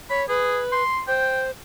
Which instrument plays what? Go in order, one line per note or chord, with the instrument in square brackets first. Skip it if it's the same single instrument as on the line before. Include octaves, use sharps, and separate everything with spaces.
[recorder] C#5 [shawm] B5
[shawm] G#4 [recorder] B4
[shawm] C6
[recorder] C5 [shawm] G5